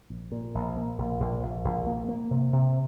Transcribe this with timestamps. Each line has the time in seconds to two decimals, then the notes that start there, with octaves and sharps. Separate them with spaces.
0.10 A#1
0.32 A#2
0.55 A#1
0.77 A#3
0.98 A#1
1.20 A#1
1.43 A#1
1.64 A#1
1.86 A#3
2.08 A#3
2.31 C3
2.53 C3